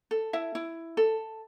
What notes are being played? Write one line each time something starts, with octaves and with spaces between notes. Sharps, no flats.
A4
E4 E5
E4
A4